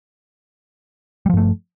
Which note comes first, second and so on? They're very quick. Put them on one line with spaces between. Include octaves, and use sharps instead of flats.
G3 F3 G2 A3